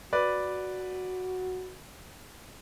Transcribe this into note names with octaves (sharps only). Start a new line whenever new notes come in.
F#4 B4 D5